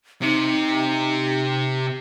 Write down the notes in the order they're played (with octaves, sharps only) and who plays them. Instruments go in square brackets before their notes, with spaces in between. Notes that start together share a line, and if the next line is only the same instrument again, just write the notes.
[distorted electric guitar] C3 [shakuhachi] D#4